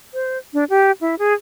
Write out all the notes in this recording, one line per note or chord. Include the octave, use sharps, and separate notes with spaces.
C5
D4
G4
E4
G#4